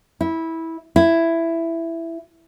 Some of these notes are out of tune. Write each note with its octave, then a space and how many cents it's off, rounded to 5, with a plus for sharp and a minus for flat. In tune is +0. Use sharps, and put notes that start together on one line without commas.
E4 -15
E4 +10